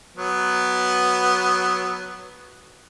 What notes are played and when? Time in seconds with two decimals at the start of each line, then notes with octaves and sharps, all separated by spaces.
0.17 F#3 B3